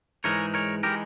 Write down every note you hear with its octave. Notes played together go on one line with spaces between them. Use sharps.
G#2 E3 G#3 D#4 A#4 C#5
A#4 C#5
E3 G#3 D#4 G4 A#4